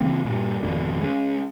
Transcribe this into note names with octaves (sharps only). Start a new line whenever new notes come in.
C#3 E3 A#3 C4
G2 A#2
G#1 F2 B2 D3
G#3 C#4